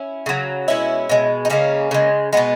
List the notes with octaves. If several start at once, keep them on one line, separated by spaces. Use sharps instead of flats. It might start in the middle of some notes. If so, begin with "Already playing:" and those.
Already playing: C#4 E4
C#3 F#3
B2 G#3 C#4 E4
B2 G#3
D#4
C#3 G#3 A#3 C#4
C#3 G#3
B2 G#3 B3